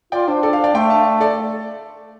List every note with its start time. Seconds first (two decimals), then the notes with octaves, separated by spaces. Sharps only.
0.12 F4 D5 G5
0.28 D4 C5
0.43 A4 D5
0.53 C5 F5
0.64 D5 G5
0.75 A3 G5 C6
0.90 F5 A5
1.20 A4 D5